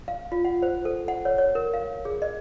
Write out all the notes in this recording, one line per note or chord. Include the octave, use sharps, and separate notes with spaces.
F5
F4
F#5
C5
A4
F#5
C#5
C#5
A#4
F5
G#4
D#5